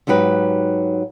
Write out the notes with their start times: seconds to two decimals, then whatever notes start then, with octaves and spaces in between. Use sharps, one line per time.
0.07 G#2 F#3 D#4 G4 B4